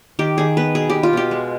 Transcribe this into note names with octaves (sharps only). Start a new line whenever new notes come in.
D#3 G4
D#3 G#4
B3 B4
B2 G#4
G4
B3
F4
B2 G4
G#3